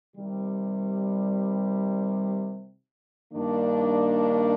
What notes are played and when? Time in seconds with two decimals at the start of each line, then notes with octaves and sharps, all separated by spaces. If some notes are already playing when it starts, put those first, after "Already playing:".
0.15 C3 D#3 G3
3.33 G2 D#3 A#3 D4